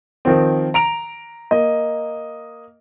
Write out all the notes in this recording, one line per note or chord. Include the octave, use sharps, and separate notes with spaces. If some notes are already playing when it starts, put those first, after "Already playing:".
D#3 F3 C4
A#5 D7 F7
A#3 D#5